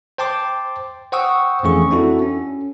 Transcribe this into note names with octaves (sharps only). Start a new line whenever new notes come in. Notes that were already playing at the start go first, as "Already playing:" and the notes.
C5 G5 A5 C6 D6
C5 F#5 G5 C#6 D#6 E6
F2 E3 A3 C#4 G#4 C#6
C4 D4 E4 F#4 A4
C#4